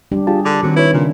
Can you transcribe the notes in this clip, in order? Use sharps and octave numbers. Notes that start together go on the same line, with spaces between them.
G3 D4 G4
G3 F4 G4 G#4 A5
D3 D6
D#3 F#3 C4
E4 B4 C#5
A#2 C#3 D4